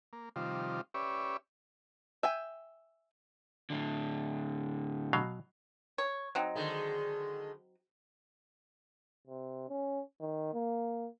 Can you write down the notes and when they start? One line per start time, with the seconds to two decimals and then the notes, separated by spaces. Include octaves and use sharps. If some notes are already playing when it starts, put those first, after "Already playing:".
0.13 A#3
0.36 C3 D#3 F3 G3 F4
0.94 C#4 G4 B4 C#5 D5 E5
2.23 E5 G5 G#5
3.70 A2 D3
5.13 B2 F#3 F5
5.98 C#5
6.35 F#3 C4 D#4
6.55 D3 D#3 G#3
9.28 C3
9.69 C#4
10.20 D#3
10.53 A#3